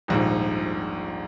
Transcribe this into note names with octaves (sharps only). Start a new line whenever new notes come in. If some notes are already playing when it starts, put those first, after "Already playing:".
D#1 A#1 G#2